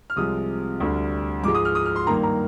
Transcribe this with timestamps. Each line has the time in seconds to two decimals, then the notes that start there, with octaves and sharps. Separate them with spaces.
0.10 F6
0.16 C2 C3 F3 G#3 D#6
0.80 D2 D3 G3
1.44 G#2 F3 G#3 D6
1.55 D#6
1.65 F6
1.75 D#6
1.86 F6
1.96 C6
2.07 G2 D#3 A#3 A#5
2.23 A#5